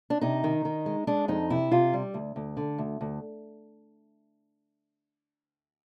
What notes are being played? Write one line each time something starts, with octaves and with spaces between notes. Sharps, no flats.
D4
C3 D#4
D#3
D#3
G#3
G#3 D4
F2 D#4
C3 E4
C3 F4
G3
D2
D2
D3
D2
D2